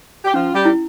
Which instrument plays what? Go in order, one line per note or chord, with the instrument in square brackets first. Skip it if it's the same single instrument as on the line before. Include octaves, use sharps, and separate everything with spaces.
[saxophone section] G4
[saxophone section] F3 F4 [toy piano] C#4
[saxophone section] G3 G4
[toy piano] E4